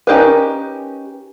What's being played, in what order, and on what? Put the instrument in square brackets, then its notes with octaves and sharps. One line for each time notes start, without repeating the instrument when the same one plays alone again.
[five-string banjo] C#4 D#4 G4 A#4 B4